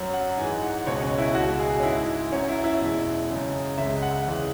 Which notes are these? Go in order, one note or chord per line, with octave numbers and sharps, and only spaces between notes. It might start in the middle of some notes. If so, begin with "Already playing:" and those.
Already playing: F#2 F#3
F#5
G#2 E3 G#3 G#5
F#5
C#2 B2 G#3 C#5
C#4
E4
C#2 B2 G#3 F#4
G#4
C#4
G#2 G#3 E4
F#2 F#3 C#4
E4
E4
E2 B2 G#3
F#2 C#3 G#3
C#2 C#3 G#3 E5
F#5
E2 C#3 E3 G#3